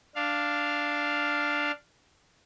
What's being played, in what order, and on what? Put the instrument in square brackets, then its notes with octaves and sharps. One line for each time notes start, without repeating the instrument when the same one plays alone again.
[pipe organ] D4 F5